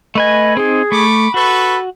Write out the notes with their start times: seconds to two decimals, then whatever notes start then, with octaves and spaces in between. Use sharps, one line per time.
0.15 A3 B4 D#5 G#5
0.57 C4 D#4 G#4
0.92 A3 B5 C#6 D6
1.34 F#4 A4 B4 B5 C#6